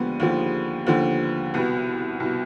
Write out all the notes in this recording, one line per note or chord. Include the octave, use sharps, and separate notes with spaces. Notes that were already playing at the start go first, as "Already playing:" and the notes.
Already playing: D#2 D3 F3 G3 G#3 B3
D#2 D3 F3
D#2 D3 F3
C2 B2 B3
C2 B2